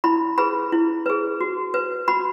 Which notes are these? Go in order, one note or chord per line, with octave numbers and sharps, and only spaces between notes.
E4 B5
G#4 B4 B5
E4
G#4 B4
F#4
B4
F#4 B5